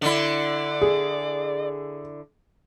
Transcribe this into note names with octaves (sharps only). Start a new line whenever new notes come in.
D3 E4 D5
G#4